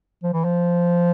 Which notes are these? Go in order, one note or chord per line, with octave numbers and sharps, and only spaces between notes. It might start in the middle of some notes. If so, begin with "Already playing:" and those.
F3
E3
F3